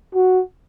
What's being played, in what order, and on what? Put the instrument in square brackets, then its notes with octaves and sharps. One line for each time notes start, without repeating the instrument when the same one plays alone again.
[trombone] F#4